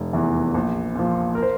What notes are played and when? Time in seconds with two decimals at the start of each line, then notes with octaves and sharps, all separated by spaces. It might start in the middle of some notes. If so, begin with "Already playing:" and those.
Already playing: F1
0.13 E2 E3
0.54 A#1
0.95 A#2 F3
1.35 A#4
1.43 C5